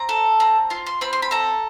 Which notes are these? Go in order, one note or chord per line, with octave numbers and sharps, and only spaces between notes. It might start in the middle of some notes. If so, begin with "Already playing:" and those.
Already playing: C4 A#5
A4
C4 A#5
F4 C6
C6
C4 B5
C6
B5
A4 A#5